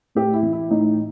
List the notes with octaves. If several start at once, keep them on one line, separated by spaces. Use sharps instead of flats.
A2 G4
E4
E3
E4
A2 D#4